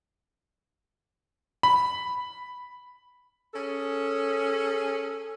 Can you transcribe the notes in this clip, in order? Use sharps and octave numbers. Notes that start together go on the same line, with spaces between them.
B5
C#4 G#4 A4